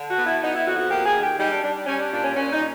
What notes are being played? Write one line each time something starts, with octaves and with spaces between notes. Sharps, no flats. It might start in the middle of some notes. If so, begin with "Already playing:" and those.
Already playing: D3
F#4
B3
E4
B3 D#4
E4
F2 F#4
F#4
A#3 G4
G#4
D#3
G4
G3 D#4
D4
G3 D4
G3 C#4
D4
A#2 D4
C#4
A#2 C#4
D#4
A#2